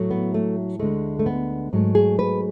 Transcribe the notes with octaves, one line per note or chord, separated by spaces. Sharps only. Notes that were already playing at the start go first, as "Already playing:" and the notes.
Already playing: A2 F#3 A3
B3
A3
D2 D3 G#3 A3
A3
B3
G#2 F#3 A3
G#4
B4